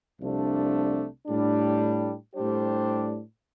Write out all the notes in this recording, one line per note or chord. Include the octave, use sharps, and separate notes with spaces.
C2 C3 F3 A3 D4
A2 G3 D4
A2 G3 D4 G4 C5